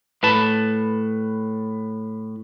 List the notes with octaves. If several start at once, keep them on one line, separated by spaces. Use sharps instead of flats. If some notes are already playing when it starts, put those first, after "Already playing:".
A2 B4 A5